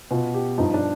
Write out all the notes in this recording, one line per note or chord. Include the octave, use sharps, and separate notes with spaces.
B2 F4
G4
G2 F3 D#4
D4